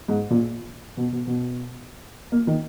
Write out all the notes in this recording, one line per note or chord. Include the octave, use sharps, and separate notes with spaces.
G#2
A#2
B2
B2
B2
A#3
D#3